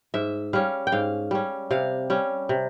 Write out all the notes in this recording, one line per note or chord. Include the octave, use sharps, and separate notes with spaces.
G#2 E5
G3 C#4 F5
G5
G#2 F5
G3 C#4
C3 F5
G3 C#4
C3